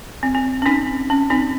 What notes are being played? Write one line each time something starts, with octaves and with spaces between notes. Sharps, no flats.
C4
C4
C#4
C4 D#4
C#4
C4 D#4